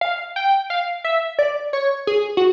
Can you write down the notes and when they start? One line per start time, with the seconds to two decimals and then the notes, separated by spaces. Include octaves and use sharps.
0.01 F5
0.36 G5
0.70 F5
1.04 E5
1.39 D5
1.73 C#5
2.07 G#4
2.37 F#4